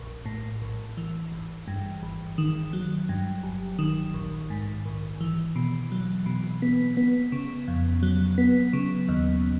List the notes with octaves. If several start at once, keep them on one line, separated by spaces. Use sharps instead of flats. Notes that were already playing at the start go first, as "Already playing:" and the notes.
Already playing: A#1
A2
A#1
E3
G#1
G2
G#1
D#3
F#3
G2
G1
D#3
A#1
G#2
A#1
E3
B2
F#3
B2
B3
B3
C#3
F2
F#3
B3
C#3
D#2